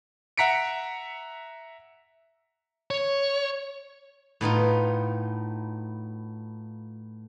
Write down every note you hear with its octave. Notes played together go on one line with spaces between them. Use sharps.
E5 F#5 A#5 B6 C#7 D7
C#5
A2 B3 D#4 F4